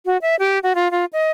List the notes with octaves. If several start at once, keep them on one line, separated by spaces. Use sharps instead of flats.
F#4
E5
G4
F#4
F4
F4
D#5